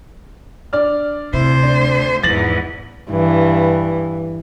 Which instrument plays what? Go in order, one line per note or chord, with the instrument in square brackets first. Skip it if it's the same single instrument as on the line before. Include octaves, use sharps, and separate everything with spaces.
[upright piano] D4 D5 F6
[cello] D2 C5 [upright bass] C3 [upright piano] E4
[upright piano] D4
[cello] E2 G#2 [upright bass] F3 [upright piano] A6 A#6 F#7
[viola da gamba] G2 E3